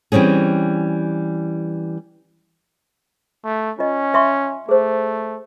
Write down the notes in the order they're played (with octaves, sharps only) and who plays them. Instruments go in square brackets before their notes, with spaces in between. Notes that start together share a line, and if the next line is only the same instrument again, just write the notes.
[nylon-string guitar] E3 G3 C4 C#4 G#4
[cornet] A3
[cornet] C#4 [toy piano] F4 D#5
[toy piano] E5 C6 C#6
[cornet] A3 [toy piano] G#4 C5